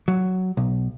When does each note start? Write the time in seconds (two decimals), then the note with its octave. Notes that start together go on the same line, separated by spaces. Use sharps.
0.08 F#3
0.57 B1